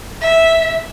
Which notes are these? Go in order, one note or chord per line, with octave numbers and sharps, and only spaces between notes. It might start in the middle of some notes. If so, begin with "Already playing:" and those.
E5